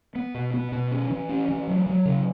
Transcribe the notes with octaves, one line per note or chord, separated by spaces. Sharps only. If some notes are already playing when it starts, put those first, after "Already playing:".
B3
B2
B3
B2
C#4
E3
C#4
E3
F#3
F#3
C#3